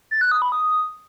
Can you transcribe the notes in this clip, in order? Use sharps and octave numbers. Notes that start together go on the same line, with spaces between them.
A6
F#6
D#6
B5
D#6